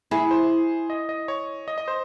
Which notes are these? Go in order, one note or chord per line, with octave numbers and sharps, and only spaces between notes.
E4 G#4
C5
D#5
D#5
C#5
D#5
D#5
C5